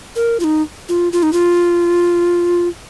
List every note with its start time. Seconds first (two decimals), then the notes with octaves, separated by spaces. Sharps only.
0.16 A#4
0.40 F4
0.44 D#4
0.89 F4
1.13 F4
1.23 D#4
1.33 F4